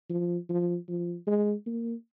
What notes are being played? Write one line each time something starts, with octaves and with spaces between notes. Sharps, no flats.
F3
F3
F3
G#3
A#3